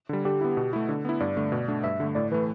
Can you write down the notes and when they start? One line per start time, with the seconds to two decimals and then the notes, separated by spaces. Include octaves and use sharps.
0.09 D3 G3
0.25 D3 G4
0.41 B3 E4
0.57 B2
0.73 A3 E4
0.89 D3
1.05 B3 E4
1.20 G2 D5
1.37 D3 A3
1.52 B2
1.68 A3 D4
1.84 G2 E5
2.00 D3 A3
2.15 A2 D5
2.31 E3 A3 B4